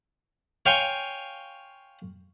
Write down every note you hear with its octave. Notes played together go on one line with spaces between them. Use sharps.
C#5 F5 G5 G#5 C6 C#6